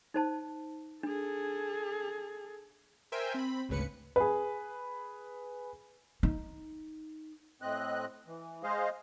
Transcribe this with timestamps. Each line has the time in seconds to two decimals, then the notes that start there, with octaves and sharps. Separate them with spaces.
0.14 D#4 C5 A5
1.03 D4 G#4 A4
3.12 A#4 C5 E5 G5 G#5
3.34 C4 B5
3.69 G#1 D2 C#3 B4 C#7
4.16 G#4 B4
6.23 D#4
7.62 A2 C4 D#5 F#6
8.27 E3
8.63 G#3 G#4 C5 D#5 F5